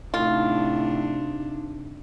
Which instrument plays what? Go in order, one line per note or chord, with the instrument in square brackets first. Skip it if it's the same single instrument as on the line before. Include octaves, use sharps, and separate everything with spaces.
[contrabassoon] A2 [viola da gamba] C3 D4 [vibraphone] D#4 [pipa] F4